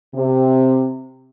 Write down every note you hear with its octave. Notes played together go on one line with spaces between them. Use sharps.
C3